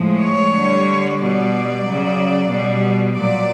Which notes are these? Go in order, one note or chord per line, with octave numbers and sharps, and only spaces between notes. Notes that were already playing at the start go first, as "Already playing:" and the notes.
Already playing: A2 F3 G#3
C#5
D3 G3
B2 G3 D5
C#3 F#3
B2 G3
A#2 F#3 D5